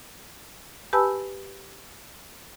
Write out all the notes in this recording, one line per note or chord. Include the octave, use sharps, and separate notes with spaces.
G4 B4 G#5 A5 B5 E6